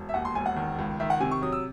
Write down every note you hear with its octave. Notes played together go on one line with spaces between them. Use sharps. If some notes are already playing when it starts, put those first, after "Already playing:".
Already playing: E1
E5
D#2 F#5
C6
E1 G#5
F#5
D#3
C#2
D#3 E5
F#5
C3 G#5
C#6
F#3 D#6
E6